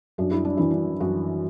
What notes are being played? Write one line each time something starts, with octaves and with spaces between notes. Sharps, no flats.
F#2 D4
E4
D4
E3 E4
D4
F#2 F#4